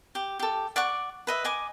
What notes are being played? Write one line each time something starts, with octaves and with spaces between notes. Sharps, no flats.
G4
G4 A4
D5 F#5 C#6 D6
B4 D#5 E5
D#5 G#5 D6